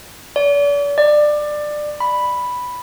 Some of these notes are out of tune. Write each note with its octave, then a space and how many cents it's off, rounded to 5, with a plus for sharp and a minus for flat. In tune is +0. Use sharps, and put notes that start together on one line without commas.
D5 -40
D5 +20
B5 +0